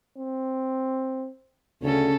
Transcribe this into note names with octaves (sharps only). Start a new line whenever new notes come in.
C4
D2 C#3 C#4 A4